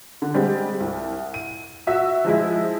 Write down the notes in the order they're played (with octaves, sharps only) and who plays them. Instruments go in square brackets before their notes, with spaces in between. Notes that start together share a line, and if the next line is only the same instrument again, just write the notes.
[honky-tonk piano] D3
G3 G#3 C4
C2
D#7
F#4 E5 E6
F3 G#3 E4